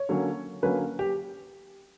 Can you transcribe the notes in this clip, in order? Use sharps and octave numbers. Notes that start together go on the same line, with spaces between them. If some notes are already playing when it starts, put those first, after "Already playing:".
Already playing: C#5
D3 F#3 A#3 C#4
D3 F#3 A#3 C#4 B4
G4